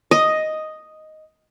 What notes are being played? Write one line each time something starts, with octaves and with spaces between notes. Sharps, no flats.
D#5